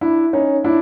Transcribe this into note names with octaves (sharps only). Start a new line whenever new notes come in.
D4 E4
C#4 D#4
D4 E4